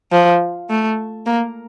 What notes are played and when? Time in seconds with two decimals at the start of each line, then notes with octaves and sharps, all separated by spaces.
0.12 F3
0.70 A3
1.26 A#3